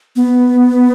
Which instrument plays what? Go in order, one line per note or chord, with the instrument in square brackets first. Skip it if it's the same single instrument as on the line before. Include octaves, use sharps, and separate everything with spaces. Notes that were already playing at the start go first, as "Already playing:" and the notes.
[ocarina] B3